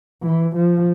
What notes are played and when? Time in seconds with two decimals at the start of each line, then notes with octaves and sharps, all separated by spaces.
0.23 E3
0.56 F3